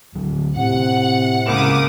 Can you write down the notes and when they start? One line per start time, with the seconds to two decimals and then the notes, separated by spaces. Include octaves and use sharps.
0.14 D2 D3 F#3
0.56 A2 C3 F#5
1.46 C#2 A#3 D6 D#6 E7